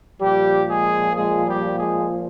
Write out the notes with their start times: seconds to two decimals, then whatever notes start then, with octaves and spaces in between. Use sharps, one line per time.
0.21 A#2 F3 G3 G4
0.68 G#3 G#4
1.16 G#3 G#4
1.47 G3 G4
1.78 G#3 G#4